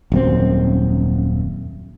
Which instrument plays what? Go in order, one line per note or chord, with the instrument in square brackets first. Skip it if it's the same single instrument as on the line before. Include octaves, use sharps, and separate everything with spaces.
[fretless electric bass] D#1 F#2 C4